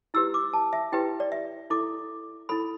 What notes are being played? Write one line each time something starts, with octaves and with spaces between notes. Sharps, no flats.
E4 G4 B4 E6
D6
A5
E5
E4 G4 B4 G5
D5
E5
E4 A4 D6
E4 A4 B5